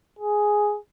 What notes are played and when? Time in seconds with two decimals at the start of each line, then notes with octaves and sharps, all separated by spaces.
0.19 G#4